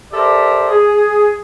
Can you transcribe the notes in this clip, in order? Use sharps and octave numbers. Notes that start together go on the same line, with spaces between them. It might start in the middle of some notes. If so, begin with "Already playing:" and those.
G4 A4 A#4 C5 D5 E5
G#4